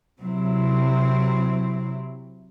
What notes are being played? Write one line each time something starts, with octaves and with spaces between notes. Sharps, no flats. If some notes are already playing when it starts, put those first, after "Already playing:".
C3 F#3 C4 E4